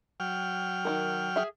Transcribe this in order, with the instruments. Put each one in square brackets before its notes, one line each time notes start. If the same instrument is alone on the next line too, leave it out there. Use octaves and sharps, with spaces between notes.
[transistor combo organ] F#3 G5 F6
[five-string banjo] D#3 G#3 A#4
G#4 E5